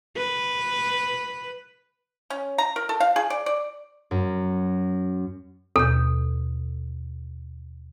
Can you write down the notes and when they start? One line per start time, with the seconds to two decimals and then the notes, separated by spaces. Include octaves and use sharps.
0.17 B4
2.30 C#4
2.58 A#5
2.76 A#4
2.89 A4
3.00 F5
3.16 G#4
3.30 D5
3.46 D5
4.11 F#2
5.76 D#2 B2 A4 G6